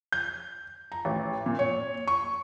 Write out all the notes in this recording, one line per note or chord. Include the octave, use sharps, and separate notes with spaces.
G6
A#5
A1
A#2
C#5
C#6